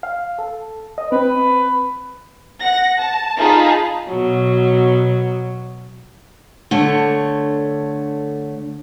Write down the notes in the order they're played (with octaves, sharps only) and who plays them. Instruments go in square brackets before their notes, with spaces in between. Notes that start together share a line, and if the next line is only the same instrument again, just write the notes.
[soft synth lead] F5
A4
D#5
[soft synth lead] C4 [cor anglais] B4
[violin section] F#5 A#6
A5
D#4 F4 G#4 F5 A5 B5
[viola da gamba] B2 F#3
[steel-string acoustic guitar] D3 A3 C#5